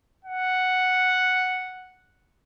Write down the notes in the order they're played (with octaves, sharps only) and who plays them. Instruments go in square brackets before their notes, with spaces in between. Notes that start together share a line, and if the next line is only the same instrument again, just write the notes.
[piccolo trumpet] F#5